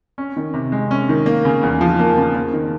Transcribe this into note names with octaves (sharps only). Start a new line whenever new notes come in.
C#4
D#3
C3
G#3
C#4
D#3
A#3
C#3
E2
F3
A#3
C#3
A#3
D#3